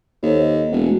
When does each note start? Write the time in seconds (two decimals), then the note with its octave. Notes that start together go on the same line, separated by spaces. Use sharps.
0.23 D#2 A4 C5 C#5
0.40 D#5
0.71 E1
0.84 G#3 A3 F#4